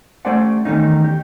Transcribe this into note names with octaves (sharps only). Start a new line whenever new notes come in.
A3 C#4 G4 C5 D5 F#5
E2 D#3 A3 C#4 D#4
G4